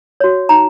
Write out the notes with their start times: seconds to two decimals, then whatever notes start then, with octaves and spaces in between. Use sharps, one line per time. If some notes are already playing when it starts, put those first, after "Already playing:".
0.20 F#4 C#5
0.49 D#4 A#5